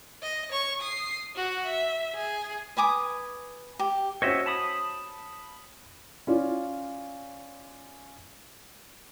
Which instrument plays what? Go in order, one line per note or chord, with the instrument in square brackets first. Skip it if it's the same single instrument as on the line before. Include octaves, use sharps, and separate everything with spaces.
[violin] D#5
C#5 C#6
D#6 C7
F#4 F#5
E5
G#4
[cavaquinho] B4 G#5 D6 D#6
G4
[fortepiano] C#4 F#4 C5 [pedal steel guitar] C#5 D#5 E5
[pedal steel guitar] A5 B5 D#6
[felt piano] C#4 F4 D5